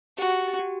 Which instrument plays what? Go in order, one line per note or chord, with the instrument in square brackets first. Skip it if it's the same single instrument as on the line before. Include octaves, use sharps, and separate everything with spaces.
[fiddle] F#4 [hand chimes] G4
[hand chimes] G4
F#4